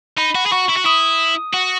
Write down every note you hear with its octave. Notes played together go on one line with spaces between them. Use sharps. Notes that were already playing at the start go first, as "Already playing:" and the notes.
D#4 B5
F#4
G#4
F#4 C#6
E4
F#4
E4 D#6
F#4